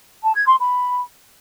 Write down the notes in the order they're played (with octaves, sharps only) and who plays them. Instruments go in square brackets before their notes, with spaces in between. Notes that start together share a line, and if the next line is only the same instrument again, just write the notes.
[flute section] A5
G#6
C6
B5